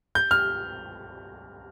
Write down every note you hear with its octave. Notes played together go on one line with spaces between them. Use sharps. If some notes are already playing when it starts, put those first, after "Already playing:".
G6
F6